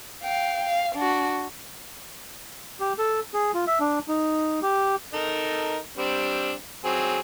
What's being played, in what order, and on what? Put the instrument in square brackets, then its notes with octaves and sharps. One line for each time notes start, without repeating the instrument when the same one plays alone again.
[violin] F5 G5
F5
D4 F#4
[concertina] G4
A4
G#4
F4
E5
D4
D#4
G4
[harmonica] D#4 A4 A#4
G3 C4 D4
F#3 C4 G#4